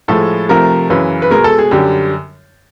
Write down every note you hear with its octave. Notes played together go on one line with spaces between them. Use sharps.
A2 F3 G#3 A4
C3 F3 A3 A#4
F#2 C#3 E3 B4
B4
B2 G#3 A#4
A4
G#4
F#2 D3 G3 G4